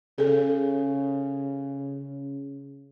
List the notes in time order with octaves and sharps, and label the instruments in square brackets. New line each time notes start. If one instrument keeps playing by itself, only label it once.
[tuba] C#3 [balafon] G#4 A4